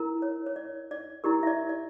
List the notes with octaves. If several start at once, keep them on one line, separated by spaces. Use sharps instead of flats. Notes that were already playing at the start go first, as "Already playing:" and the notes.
Already playing: E4 A#4
C#5
C#5
D5
D5
E4 G4 A#4 D5
E5
D5
D5